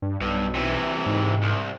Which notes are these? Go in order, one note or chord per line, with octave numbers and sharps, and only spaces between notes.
G2
B1 G2
C3 E3
G#2
C2